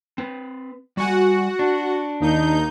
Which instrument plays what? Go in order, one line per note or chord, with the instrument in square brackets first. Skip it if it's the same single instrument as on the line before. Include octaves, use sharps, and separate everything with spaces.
[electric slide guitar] C4 B4
[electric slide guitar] G3 G#5 [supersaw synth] F#4 F#5
[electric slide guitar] D4
[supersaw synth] D#2 D#4 G6